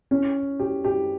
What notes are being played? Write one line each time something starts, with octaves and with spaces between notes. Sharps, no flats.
C#4
G4
G4